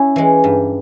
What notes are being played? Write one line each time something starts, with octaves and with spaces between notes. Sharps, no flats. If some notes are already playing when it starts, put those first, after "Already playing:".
Already playing: C#4 E4
E3 G#3
G2